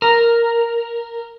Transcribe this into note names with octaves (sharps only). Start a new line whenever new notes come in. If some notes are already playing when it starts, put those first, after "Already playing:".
A#4